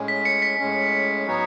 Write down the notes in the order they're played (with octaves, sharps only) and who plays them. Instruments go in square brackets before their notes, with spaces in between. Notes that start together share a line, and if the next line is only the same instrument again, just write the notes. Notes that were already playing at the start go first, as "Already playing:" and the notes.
Already playing: [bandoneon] A2 G#3 C#4
[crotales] B6
C#7
B6
[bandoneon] A2 G#3 C#4
F#3 B3 D#4 F#4 C#5